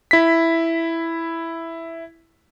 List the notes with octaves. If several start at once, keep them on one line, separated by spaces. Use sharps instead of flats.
E4 B6